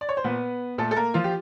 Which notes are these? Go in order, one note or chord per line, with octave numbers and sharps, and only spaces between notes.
D5
C#5
C5
A#2 B3 B4
A#2 A3 A4
A4
A#3 A#4
F3 F4
G4